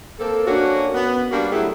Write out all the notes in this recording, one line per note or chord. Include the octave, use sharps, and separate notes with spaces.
A#3 C4 A4
A#3 C#4 D4 F#4
B3
G3 A#3 D4 F#4
F#3 A3 E4 G4 G#4